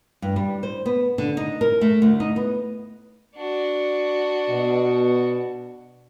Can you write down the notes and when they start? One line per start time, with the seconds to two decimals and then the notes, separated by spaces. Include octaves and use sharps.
0.22 G2
0.36 G3
0.63 C5
0.86 B3
1.18 D3
1.37 D#4
1.61 A#4
1.81 A3
2.02 D2
2.20 D#4
2.36 B3
3.35 D4 F#4
4.49 B2